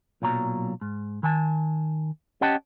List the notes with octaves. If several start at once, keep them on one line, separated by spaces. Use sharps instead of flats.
B1 A#2 F#3 A#5
G#2
D#3 G#5 A5
C#4 G4 D#5 F#5 G5 A5